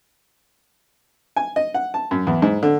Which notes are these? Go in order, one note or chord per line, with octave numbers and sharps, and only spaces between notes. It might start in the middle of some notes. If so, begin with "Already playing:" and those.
G#5
D#5
F#5
A5
F#2
E2
G#2
D3